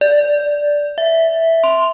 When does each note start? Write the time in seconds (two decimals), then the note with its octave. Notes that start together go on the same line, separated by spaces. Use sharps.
0.01 D5
0.98 E5
1.64 C6